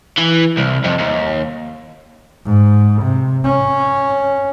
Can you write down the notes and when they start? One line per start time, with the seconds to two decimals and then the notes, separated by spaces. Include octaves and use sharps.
0.18 E3
0.59 C2
0.85 F2
0.99 D#2
2.46 G#2
3.02 C3
3.45 C#4